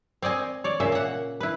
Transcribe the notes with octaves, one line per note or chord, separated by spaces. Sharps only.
C4 D5 D#5 G#5
C#5 D5
A#2 C#3 E5
A#3 F#5
E4 B4